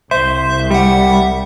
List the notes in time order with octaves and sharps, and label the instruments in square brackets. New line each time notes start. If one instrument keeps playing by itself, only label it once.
[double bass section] C2 [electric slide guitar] C5 [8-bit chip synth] E5
[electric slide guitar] G3 [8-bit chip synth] E5 F#5